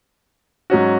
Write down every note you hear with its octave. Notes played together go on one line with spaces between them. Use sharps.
G#2 F#3 C#4 F#4